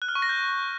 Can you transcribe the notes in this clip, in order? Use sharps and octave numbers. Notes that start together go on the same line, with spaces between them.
F#6
F6
C#6
A#6
G6